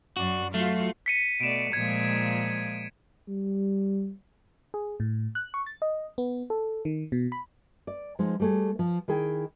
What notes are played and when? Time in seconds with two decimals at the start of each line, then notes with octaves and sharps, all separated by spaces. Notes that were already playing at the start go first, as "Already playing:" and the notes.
0.17 F#2 F#4 D5
0.54 F#3 A3 F4 F#4 F5
1.06 B6 C#7 D#7
1.40 B2 A3 D5 D7 E7
1.73 A#2 F3 G#3 G#6
3.28 G3
4.74 G#4
5.00 A2
5.35 F#6
5.54 C#6
5.66 A6
5.82 D#5
6.18 B3
6.50 A4
6.85 D#3
7.12 B2
7.32 B5
7.87 D5
8.19 F3 G#3 D#4
8.40 G3 A3 G#4
8.79 F3
9.08 D#3 E4 G#4 G5